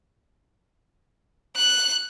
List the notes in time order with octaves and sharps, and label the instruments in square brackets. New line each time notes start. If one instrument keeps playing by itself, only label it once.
[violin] F#6